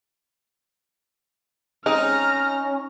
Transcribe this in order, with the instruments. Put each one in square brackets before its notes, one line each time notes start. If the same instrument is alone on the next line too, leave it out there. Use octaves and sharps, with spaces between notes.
[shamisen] G#3 C4 [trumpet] C#4 [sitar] D#4 [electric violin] A#5 F6